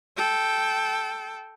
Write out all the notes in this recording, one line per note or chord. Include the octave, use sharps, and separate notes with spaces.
A4 G5